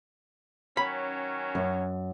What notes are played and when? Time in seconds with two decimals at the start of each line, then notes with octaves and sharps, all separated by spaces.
0.77 D#3 F#3 C#4 B5
1.55 F#2